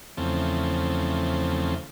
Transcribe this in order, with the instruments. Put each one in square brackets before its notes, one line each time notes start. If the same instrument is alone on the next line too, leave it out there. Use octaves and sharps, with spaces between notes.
[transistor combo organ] E2 C#3 F3 A3 C4